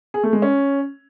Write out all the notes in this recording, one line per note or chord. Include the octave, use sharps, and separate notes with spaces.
G#4
A3
G#3
C#4